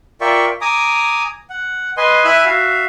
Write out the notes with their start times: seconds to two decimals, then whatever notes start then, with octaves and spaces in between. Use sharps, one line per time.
0.21 F4 A#4 D5 E5 G5 C#6
0.61 G#5 A#5 D6 D#6
1.50 F#5
1.97 B4 D#5 G#5 C6
2.25 E4 E5 G#5 B5 E6 F#6
2.45 F#4 E5 F5